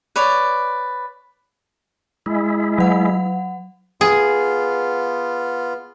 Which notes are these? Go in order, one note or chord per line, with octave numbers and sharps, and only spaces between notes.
B4 C#5 D5
G#3 E4
F#3 F#5
B3 F4 G#4